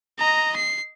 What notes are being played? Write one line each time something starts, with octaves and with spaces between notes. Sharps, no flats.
D#5 A#5
C7